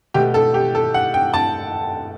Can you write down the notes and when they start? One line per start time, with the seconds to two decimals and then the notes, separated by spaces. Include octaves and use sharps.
0.14 B2 A3 G4
0.34 A4
0.54 G4
0.75 A4
0.94 F#5
1.14 G5
1.34 A5